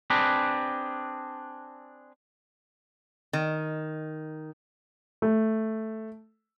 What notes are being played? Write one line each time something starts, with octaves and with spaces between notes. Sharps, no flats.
C4 D4 G#4 B4
D#3
A3